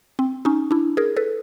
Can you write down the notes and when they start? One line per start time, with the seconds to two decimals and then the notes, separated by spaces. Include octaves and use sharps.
0.19 C4
0.45 C#4 D#4
0.71 D4 E4
0.97 G#4 A#4
1.17 A4 B4